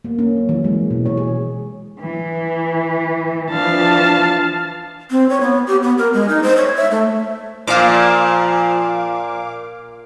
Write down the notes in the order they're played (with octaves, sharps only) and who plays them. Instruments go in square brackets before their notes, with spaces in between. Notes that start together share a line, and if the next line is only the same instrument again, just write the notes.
[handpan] A#3
C#4
F#3
E3
G#3
B2
C#5
G#4
[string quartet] E3
[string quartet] E3 F3 D4 [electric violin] F5 A5
[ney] C4
C#5
B3
G4
B3
A#4
G#3
D#4
C5
C#5
E5
A3
[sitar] A#2 [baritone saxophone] F3 [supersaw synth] F5 D6